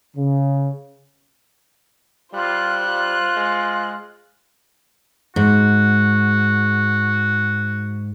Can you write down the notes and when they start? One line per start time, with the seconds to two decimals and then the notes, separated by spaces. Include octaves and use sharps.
0.17 C#3
2.34 G3 F4 C5 F#6
2.87 F4
3.37 G#3
5.36 G#2 F#4